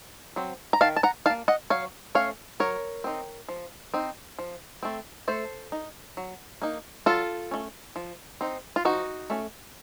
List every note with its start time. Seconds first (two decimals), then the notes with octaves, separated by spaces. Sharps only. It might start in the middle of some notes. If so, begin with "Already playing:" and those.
0.36 F#3 C4
0.73 A#5
0.81 D#3 F5 A5
0.96 A5
1.03 F#5 A#5
1.26 D#4 F5 A5
1.30 A#3
1.48 D#5 F#5
1.70 F#3 C#5 F5
2.15 A3 C#4 C#5 F5
2.60 F#3 A#4 C#5
3.04 C4 D#4
3.49 F3
3.94 C4 D#4
4.39 F3
4.83 A3 C4
5.28 A3 A4 C5
5.72 D#4
6.17 F#3
6.62 A#3 D#4
7.06 F#3 F4 A4
7.51 A3 C#4
7.96 F3
8.41 C4 D#4
8.76 F4
8.85 F3 D#4 F#4
9.30 A3 C#4